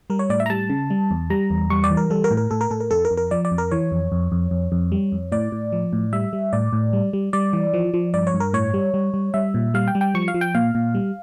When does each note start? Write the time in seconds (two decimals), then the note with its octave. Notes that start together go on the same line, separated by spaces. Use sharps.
0.10 G3 A#4
0.19 C#5
0.30 A2 D5
0.40 E5
0.46 A#5
0.50 G3 A5
0.70 C#3
0.90 G3
1.11 E2
1.30 G3 A#5
1.50 E2
1.70 G3 C#6
1.84 D5
1.91 E3
1.97 A#4
2.10 G3 A4
2.24 A#4
2.31 A2
2.37 A#4
2.51 A2 A4
2.61 A#4
2.71 A2 A4
2.80 A#4
2.91 F2 A4
3.05 A#4
3.11 F2
3.17 A#4
3.31 F3 D5
3.45 D5
3.51 F2
3.58 A#4
3.71 E3 C#5
3.92 F2
4.12 F2
4.32 F2
4.51 F2
4.72 F2
4.92 G3
5.12 F2
5.32 A2 D5
5.52 A2
5.72 F3
5.93 A2
6.13 G3 E5
6.33 G3
6.53 A2 D5
6.73 A2
6.93 G3
7.13 G3
7.33 G3 D5
7.53 E3
7.74 F3
7.94 F3
8.14 G2 D5
8.27 C#5
8.34 G2
8.40 A#4
8.53 A2 C#5
8.74 G3
8.94 G3
9.14 G3
9.34 G3 E5
9.54 A#2
9.74 G3 F5
9.88 G5
9.95 G3
10.01 G5
10.14 F3 C#6
10.28 F5
10.34 F3
10.41 G5
10.55 A#2 F5
10.75 A#2
10.95 G3